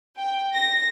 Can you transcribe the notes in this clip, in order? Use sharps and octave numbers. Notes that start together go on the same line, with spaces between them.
G5
A#6